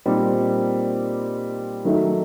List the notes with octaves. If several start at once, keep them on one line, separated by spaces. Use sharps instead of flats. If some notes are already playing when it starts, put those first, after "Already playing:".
A#2 G3 C4 D#4
D#3 F#3 A3 D#4